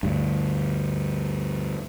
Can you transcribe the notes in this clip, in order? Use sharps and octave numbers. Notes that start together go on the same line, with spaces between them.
D2 G2